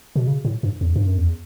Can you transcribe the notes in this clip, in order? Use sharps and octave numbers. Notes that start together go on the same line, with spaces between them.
B2
C#3
A2
G2
E2
G2
F#2
E2